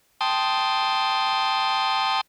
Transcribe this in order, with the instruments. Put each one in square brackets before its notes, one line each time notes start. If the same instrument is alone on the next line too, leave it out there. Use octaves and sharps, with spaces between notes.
[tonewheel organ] G5 A5 C6 D#6